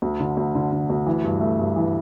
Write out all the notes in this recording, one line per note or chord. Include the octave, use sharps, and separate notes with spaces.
D2
D3
D2
D3
D3
D2
E3
G2
A3
G2
E3